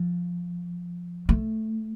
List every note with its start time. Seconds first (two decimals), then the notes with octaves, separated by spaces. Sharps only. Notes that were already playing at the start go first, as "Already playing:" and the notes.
Already playing: F3
1.29 A3